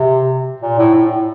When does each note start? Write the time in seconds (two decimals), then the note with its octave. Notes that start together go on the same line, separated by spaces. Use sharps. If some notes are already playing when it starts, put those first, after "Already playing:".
Already playing: C3
0.62 A#2
0.78 A2
0.94 A2